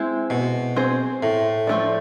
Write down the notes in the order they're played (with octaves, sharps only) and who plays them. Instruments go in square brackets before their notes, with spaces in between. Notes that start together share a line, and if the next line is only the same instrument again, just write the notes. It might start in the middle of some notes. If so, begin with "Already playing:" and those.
Already playing: [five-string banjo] G#3 C4 E4
[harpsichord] B2
[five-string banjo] C4 G#4 C5
[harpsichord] A2
[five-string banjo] F3 A3 E4 A4 D5